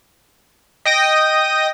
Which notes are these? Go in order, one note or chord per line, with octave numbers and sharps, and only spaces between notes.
D#5 G5 D#6 A#6